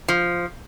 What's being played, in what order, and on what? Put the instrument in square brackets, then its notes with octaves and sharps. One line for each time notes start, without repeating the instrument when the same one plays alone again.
[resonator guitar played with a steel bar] F3